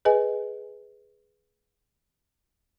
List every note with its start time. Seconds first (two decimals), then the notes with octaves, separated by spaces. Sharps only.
0.05 G#4 B4 D#5 G#5